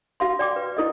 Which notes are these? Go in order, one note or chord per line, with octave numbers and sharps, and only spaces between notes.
F#4 F5 C6
D5 G5 D6
B4
E4 A4 D#5